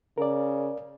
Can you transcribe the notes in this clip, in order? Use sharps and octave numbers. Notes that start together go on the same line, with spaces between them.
C#3 A#4 D5